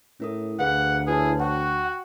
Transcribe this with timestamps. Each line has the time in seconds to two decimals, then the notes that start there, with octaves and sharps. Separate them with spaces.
0.20 A2 C#4 A#4 D#6
0.59 D2 G#4 B4 F5 F#5
1.07 E4 G#4 B4 C#5 A5
1.40 F#4 F#5 G5 C#6